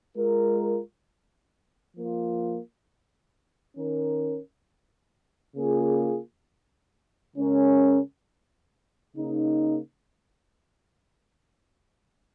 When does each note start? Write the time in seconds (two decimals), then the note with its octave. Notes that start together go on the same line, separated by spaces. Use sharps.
0.16 G#3 F4 A#4
1.95 F3 A#3 F4
3.76 D#3 C#4 A#4
5.56 C#3 A#3 F4 G#4
7.36 C#3 G#3 C#4 A#4
9.15 C#3 A#3 D#4